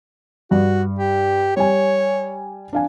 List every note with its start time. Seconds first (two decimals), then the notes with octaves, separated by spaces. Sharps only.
0.51 G2 F#4
0.99 G4
1.57 G3 C#5 G#5
2.73 D4 F5 G#5